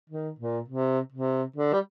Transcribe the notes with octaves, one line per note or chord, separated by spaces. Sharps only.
D#3
A#2
C3
C3
D3
G3